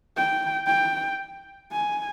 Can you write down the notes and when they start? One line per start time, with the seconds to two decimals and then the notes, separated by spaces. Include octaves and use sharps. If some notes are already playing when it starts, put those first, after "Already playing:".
0.17 G5
0.68 G5
1.72 G#5